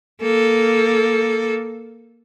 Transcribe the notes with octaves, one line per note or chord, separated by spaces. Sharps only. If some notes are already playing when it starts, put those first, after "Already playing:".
A#3 A4